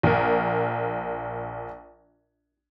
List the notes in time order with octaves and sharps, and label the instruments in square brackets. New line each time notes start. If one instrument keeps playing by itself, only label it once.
[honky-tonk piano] A#1 A#4